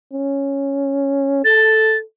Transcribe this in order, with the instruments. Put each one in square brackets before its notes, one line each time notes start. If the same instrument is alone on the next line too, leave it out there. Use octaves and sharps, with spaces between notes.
[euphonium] C#4
[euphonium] A4 [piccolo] A6